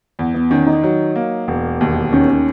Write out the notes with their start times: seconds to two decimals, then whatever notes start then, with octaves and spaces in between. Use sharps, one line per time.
0.19 E2
0.34 B3
0.51 D#3 C#4
0.67 D#4
0.83 F#3
1.16 A#3
1.48 E1
1.81 D#2
2.13 D#3 C#4
2.28 C#4